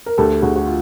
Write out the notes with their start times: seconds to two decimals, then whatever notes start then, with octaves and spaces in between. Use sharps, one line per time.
0.06 A#4
0.18 D2 G4 A4
0.42 D2 F#4 G#4
0.56 F#4
0.66 F4